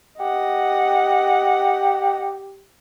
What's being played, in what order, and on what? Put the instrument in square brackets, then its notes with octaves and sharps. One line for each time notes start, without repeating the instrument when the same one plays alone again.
[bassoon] G4 [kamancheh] D#5 F#5